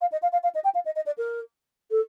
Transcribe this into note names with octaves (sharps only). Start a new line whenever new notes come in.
F5
D#5
F5
F5
F5
D#5
G5
F5
D#5
D#5
D5
A#4
A4